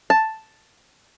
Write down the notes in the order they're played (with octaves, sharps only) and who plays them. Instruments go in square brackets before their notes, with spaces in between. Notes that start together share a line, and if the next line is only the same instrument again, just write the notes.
[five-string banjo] A5